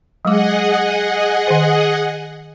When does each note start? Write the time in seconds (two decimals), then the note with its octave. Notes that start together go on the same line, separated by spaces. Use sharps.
0.25 F#3 G#3 G#4 D#5 F#5 D6
1.47 D#3 C5